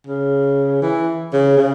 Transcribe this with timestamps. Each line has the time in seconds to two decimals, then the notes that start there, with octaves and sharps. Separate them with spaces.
0.07 C#3
0.82 E3
1.33 C#3
1.57 C#3